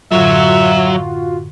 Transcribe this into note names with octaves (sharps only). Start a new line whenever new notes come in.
F#2 A2 D3 F#3 F4 F#4 E5